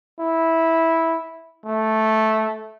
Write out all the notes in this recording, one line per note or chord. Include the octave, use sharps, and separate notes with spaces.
E4
A3